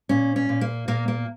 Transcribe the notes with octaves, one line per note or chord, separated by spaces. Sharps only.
A#2 C#4
C#4
A#2
A#3
A#2 A#3
A#3